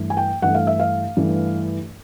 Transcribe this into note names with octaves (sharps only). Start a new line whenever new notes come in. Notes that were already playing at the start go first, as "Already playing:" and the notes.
Already playing: G2 E3 A3
G#5
G5
G2 E3 A3 F#5
F5
E5
F5
G2 E3 A3